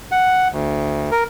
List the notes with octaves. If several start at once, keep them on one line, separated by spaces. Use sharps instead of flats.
F#5
D2
A#4